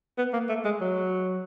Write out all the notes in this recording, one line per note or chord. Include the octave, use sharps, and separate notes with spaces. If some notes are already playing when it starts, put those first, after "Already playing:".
B3
A#3
A3
G#3
F#3